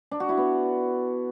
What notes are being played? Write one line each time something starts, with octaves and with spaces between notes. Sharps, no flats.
D4
F#4
E4
B3